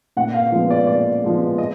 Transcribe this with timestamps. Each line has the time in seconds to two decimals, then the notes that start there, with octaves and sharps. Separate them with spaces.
0.17 A#2 F#5
0.34 F5
0.52 F3 G#3 B3
0.70 D5
0.87 A#2 D5
1.23 F3 G#3 B3
1.58 D#5